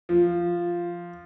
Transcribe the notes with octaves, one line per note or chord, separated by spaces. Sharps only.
F3